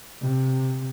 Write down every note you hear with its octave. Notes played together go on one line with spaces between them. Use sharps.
C3